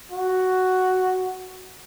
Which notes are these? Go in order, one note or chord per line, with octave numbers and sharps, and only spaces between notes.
F#4